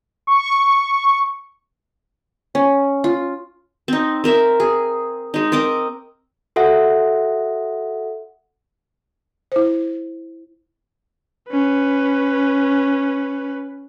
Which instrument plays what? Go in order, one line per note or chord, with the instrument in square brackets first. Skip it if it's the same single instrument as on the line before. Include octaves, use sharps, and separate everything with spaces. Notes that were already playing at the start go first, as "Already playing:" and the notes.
[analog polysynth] C#6
[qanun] C#4
F4
C4 D#4
C4 A#4 E5
G#4
G#3 D#4
C4 A#4 D#5 D6
[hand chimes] F#4 A4 E5 F#5
[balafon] E4 C5
[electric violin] C#4 B4